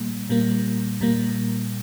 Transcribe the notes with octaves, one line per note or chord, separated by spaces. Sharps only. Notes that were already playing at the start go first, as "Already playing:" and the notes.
Already playing: A#2 G3 A#3
A#2 G3 A#3
A#2 G3 A#3